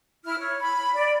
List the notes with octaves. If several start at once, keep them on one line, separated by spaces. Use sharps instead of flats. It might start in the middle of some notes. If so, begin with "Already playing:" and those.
E4 F6
C#5
B5
D5